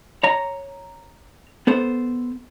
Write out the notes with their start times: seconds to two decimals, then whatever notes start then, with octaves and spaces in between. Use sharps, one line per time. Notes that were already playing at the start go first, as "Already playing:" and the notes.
0.23 C#5 A#5
1.67 B3 A4 C5